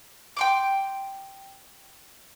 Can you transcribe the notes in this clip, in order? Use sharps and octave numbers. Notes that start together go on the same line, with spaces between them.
G5 C6 D6